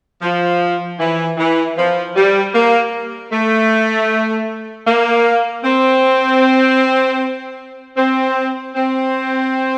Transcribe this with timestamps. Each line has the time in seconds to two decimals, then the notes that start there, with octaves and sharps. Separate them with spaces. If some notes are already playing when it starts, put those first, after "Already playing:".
0.21 F3
0.98 E3
1.37 E3
1.76 F3
2.15 G3
2.53 A#3
3.31 A3
4.86 A#3
5.63 C4
7.97 C4
8.74 C4